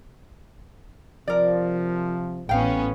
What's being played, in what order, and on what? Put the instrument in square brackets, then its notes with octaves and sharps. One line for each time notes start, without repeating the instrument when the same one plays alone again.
[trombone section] C3 F3 [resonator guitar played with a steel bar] A#4 D5
[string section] A1 B3 C#4 [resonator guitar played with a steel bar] F5 G5